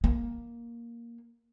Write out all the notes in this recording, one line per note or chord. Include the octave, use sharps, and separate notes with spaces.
A#3